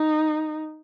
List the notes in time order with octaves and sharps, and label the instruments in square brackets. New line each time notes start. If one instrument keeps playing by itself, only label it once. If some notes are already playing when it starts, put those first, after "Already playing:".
Already playing: [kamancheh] D#4